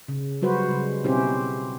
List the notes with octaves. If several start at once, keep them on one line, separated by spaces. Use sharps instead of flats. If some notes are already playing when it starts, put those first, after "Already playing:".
C#3
F#3 G3 F#4 B4 C5
C#3 G3 G#3
B2 C4 C#4 E4 G4 C5